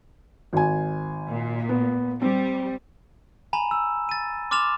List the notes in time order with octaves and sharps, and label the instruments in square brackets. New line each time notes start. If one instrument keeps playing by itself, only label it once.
[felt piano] G#1 G#5
[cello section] A#2
[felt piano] B3
[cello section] G3 [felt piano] C4
[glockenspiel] G#5 A#5 B5 E7
E6
A6 D#7
C6 D6 F6 A6 E7 F7